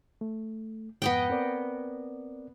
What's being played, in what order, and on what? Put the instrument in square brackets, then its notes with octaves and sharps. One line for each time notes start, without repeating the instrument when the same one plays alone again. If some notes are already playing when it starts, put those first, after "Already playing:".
[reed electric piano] A3
[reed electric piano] F2 G#2 [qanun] B3 D#5 G5
[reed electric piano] C4 A#4 D5